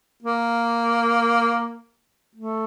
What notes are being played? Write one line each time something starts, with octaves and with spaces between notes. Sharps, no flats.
A#3
A3